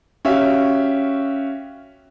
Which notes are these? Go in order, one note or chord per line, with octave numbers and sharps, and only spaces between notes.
C#4 F#4 G4 E5 F5